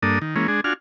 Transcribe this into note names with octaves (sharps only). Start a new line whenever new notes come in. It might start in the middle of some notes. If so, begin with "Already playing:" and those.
G2 A#3 D4 A4 D#6
D#3
E3 G#3 A#3 C#4
G#3 D4 G#4
D4 F4 F#4 G#5 F6